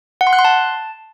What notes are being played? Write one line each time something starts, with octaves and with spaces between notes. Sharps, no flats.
F#5
C6
F#6
C6
A5